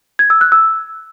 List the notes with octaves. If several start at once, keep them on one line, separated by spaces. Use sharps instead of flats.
G#6
E6
F#6
E6